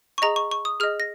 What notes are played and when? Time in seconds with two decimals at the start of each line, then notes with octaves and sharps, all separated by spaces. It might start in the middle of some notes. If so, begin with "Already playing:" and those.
0.18 C#6
0.22 G#4 D#5 A#5
0.36 C#6
0.51 C#6
0.65 D#6
0.80 G#4 F6
0.83 D#5
1.00 A#6